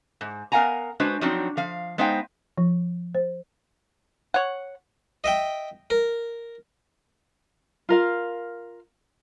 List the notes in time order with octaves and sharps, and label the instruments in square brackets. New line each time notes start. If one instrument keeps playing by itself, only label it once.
[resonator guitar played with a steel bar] G#2
B3 A#4 F5 F#5 G#5 A#5
G#3 D4 F#4 B4 C5
F3 F#3 C4 D4 D#4 F#4
F3 F5
G#3 B3 D#4 C5 F5 G5
[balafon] F3
C5
[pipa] C#5 F#5
[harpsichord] D#5 E5 G5
A#4
[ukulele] F4 A#4 F5